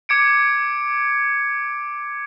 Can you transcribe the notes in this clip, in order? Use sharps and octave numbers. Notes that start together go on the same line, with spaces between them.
D6 G#6 C#7 D7